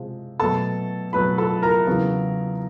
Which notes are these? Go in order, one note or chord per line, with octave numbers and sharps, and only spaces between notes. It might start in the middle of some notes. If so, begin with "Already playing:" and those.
Already playing: C3 F3 G#3
B2 F#3 A3 A4 A5
B2 F#3 A3 B4 B5
A4 A5
A#4 A#5
E2 C#3 F#3 B3